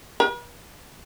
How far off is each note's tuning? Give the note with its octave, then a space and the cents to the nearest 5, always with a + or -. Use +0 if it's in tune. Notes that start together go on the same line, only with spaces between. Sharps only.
B4 -45